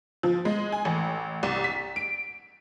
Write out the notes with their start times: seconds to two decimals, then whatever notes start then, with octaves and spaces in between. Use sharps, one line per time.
0.23 F3
0.45 G#3
0.72 G#5
0.85 A1
1.43 C2
1.64 B6
1.96 D7